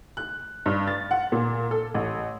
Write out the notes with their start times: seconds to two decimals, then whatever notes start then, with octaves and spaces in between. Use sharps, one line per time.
0.17 F#6
0.66 G2
0.87 A6
1.11 F#5
1.32 A#2
1.71 A4
1.94 A1